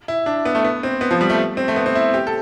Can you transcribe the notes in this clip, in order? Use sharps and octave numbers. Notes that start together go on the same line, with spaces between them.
E4
D4
B3
A3
B3
C4
B3
F3
G3
A3
C4
A3
B3
C4
E4
G4
A4